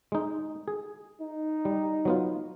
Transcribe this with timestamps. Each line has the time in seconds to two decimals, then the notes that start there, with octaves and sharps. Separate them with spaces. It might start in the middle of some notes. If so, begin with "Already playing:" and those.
0.12 G#3 D#4
0.68 G#4
1.21 D#4
1.65 G3
2.05 F#3 B3 F4